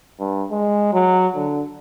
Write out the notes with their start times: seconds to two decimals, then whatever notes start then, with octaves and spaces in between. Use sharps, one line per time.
0.20 G2
0.51 G#3
0.93 F#3
1.35 D3